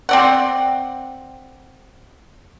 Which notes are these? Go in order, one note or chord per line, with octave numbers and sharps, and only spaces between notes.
C4 D5 F#5